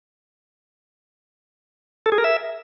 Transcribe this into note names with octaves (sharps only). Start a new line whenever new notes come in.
A4
G#4
A#4
E5